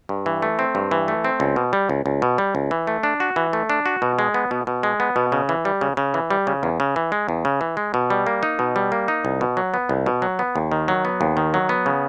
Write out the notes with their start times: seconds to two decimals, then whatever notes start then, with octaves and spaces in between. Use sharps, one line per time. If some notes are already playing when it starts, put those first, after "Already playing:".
0.09 G2
0.26 E3
0.42 A3
0.59 C4
0.75 G2
0.91 E3
1.08 A3
1.25 C4
1.40 C#2
1.56 B2
1.73 G3
1.89 C#2
2.06 C#2
2.22 B2
2.38 G3
2.55 C#2
2.71 E3
2.87 A3
3.03 D4
3.20 F#4
3.36 E3
3.53 A3
3.70 D4
3.86 F#4
4.02 B2
4.19 G#3
4.34 B3
4.51 B2
4.67 B2
4.83 G#3
5.00 B3
5.16 B2
5.32 C#3
5.49 E3
5.65 G3
5.81 C#3
5.97 C#3
6.14 E3
6.30 G3
6.47 C#3
6.63 E2
6.80 C#3
6.96 E3
7.12 G#3
7.29 E2
7.45 C#3
7.61 E3
7.77 G#3
7.94 B2
8.10 G3
8.27 A#3
8.43 D#4
8.59 B2
8.76 G3
8.92 A#3
9.08 D#4
9.25 C2
9.41 B2
9.57 F#3
9.74 B3
9.89 C2
10.06 B2
10.22 F#3
10.39 B3
10.56 D#2
10.72 D#3
10.88 F#3
11.05 B3
11.21 D#2
11.37 D#3
11.54 F#3
11.69 B3
11.86 C#3